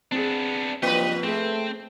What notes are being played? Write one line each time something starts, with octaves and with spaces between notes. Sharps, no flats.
B3 C4 D4 G#4
F#1 G2 F3 A#3 C4 B4 D#5
A3 C4 G#4